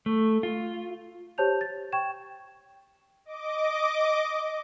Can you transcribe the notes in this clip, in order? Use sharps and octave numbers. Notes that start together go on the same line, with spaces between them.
A3
F4
G4 C5 C#5 A5 G6 F7
A6
G5 C#6 G#6 E7
D#5 D6